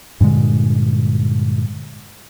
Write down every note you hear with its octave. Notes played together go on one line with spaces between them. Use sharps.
G2 A#2 D3 G#3